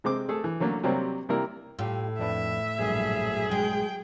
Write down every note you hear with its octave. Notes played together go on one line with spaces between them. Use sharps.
C3 G#3 C4 D6
A3 G#4 A4
E3
D3 F#3 A3 A#3 C#4
C3 F#3 G3 A#3 C4
C3 G3 A#3 E4 A#4
A2 F4 G4 G5
F2 D4 B4 E5
A#1 G2 F#3 G#4
G#3 G5